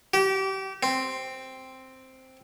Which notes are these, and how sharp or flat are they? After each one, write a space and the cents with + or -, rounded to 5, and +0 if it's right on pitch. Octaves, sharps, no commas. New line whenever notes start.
G4 -30
C4 +0